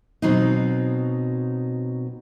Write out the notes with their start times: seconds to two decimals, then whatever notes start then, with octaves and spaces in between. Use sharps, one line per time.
0.22 B2 F#3 C4 D#4